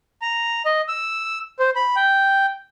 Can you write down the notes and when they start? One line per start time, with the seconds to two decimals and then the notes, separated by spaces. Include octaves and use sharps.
0.22 A#5
0.66 D#5
0.88 E6
1.59 C5
1.76 B5
1.96 G5